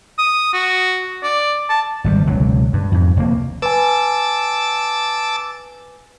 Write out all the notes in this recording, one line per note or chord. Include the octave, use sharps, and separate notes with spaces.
D#6
F#4
D5
A5
G#1 D#3 G3
E1 C#2 D3 F#3
G2
F2 G#2
F1 D2 A#3
B4 G#5 A5 D6 E6